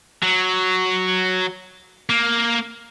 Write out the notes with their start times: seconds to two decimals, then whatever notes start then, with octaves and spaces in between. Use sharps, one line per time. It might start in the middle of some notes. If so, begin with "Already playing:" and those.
0.23 F#3
2.10 A#3